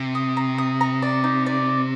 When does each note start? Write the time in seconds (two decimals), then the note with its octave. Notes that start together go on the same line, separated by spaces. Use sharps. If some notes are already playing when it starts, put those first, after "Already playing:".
Already playing: C3
0.15 D#6
0.37 A#5
0.58 D#6
0.81 A#5
1.02 D5
1.24 D#4
1.46 D5